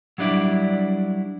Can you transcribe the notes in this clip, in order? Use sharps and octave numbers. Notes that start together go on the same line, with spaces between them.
F#3 G3 D4 E4 D5